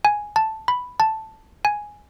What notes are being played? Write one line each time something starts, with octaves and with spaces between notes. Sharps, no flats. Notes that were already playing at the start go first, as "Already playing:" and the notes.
G#5
A5
B5
A5
G#5